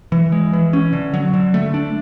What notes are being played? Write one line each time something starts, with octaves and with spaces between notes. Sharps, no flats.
E3
G#3
E3
C#4
D3
F#3
D3
A3
D4